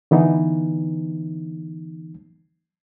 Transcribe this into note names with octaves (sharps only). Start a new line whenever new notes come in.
D3 E3 B3 D#4